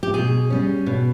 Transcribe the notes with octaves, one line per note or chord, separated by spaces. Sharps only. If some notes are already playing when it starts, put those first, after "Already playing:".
G4
B2 G#4
G3 C#4
B2